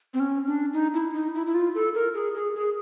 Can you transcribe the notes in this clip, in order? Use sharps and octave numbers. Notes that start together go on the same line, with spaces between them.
C4
C#4
D4
D#4
E4
D#4
E4
E4
F4
A4
A#4
G#4
G#4
G#4